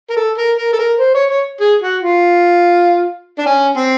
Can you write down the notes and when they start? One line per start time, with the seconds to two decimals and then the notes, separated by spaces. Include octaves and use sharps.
0.10 A#4
0.17 A4
0.38 A#4
0.58 A#4
0.73 A4
0.79 A#4
0.99 C5
1.14 C#5
1.30 C#5
1.60 G#4
1.82 F#4
2.02 F4
3.39 D4
3.46 C#4
3.77 C4